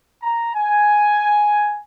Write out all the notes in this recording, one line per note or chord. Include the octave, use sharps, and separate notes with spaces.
A#5
G#5